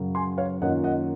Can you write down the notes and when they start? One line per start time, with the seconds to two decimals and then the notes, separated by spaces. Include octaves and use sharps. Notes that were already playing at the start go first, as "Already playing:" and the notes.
Already playing: F#2 C#3 F#3
0.15 G#5 C6
0.38 C#5 F5
0.61 F#2 D#3 A#3 C#4 F4 D#5 F#5
0.84 D#5 F#5